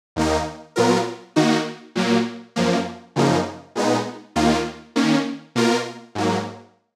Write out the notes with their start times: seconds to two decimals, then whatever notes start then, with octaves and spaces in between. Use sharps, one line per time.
0.16 D#2 D#3 A#3 D#4
0.76 A#2 F#3 B3 F4 A#4
1.36 D#3 A#3 D#4 F#4
1.95 A#2 F#3 A#3
2.56 F#2 F3 A#3
3.16 F#2 C#3 F3 A#3 D#4
3.75 A#2 G#3 B3 D#4
4.36 D#2 D#3 A#3 F4
4.96 D#3 A#3 C#4
5.55 B2 A#3 F4 A#4
6.15 G#2 F#3 A#3